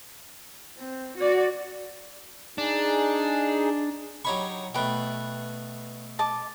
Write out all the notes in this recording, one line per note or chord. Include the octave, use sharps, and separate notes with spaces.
C4
F#4 D5
D4 D#4 G#4
F#3 D#4 G4 C#5 B5 C#6
B2 A3 B4 G5
D#5 A5 D6